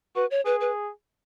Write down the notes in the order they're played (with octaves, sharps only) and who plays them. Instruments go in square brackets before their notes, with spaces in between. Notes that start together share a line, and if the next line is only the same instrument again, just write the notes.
[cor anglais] F#4 [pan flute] B4
[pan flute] C#5
[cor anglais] G#4 [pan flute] B4
[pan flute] B4